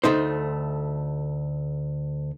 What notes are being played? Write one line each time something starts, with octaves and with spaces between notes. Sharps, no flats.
D2 A3 D#4 C5